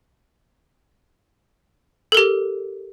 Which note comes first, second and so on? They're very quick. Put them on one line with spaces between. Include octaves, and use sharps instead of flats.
A4 A#4 G4